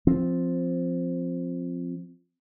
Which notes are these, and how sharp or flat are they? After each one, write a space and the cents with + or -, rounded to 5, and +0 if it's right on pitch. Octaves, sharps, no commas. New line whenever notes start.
F3 +0 C4 +0